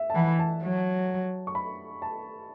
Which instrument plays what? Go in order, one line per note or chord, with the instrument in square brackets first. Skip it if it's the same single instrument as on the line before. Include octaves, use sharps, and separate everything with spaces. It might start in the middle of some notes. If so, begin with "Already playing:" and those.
Already playing: [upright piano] E5
A5
[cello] E3 [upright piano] F#5
[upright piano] A5
[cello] F#3
[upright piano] C#6
B5
A5